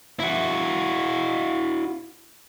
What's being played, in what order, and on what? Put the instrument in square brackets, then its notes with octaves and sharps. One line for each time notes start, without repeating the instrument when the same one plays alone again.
[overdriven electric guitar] E4 F#4